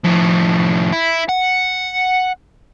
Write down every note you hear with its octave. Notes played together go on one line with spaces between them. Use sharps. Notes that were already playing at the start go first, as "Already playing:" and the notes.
A2 F3
E4
F#5